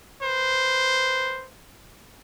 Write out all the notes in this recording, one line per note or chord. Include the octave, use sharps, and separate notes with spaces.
B4 C5